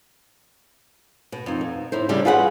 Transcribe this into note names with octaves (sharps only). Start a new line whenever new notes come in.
B2
F2 D#4
B2
A2 D#4 E4 C5
C#3 G3 D4 E4 G4
F4 F#4 G#4 B4 C#5 F#5